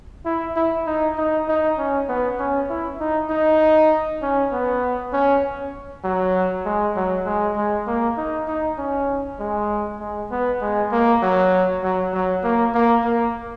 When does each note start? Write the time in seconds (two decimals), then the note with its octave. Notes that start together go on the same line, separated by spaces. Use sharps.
0.25 E4
0.56 E4
0.87 D#4
1.18 D#4
1.48 D#4
1.78 C#4
2.09 B3
2.39 C#4
2.69 E4
3.00 D#4
3.30 D#4
4.22 C#4
4.52 B3
5.13 C#4
6.04 F#3
6.65 G#3
6.96 F#3
7.26 G#3
7.56 G#3
7.87 A#3
8.17 D#4
8.48 D#4
8.78 C#4
9.39 G#3
10.00 G#3
10.31 B3
10.61 G#3
10.92 A#3
11.22 F#3
11.83 F#3
12.13 F#3
12.44 A#3
12.74 A#3
13.04 A#3